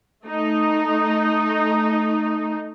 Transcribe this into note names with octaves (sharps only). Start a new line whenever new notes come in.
A3 D#4